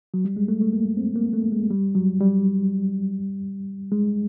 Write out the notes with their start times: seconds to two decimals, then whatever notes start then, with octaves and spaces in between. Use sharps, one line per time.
0.14 F#3
0.25 G3
0.37 G#3
0.48 A3
0.61 A3
0.73 A#3
0.97 C4
1.15 A#3
1.33 A3
1.52 G#3
1.70 G3
1.95 F#3
2.20 G3
3.92 G#3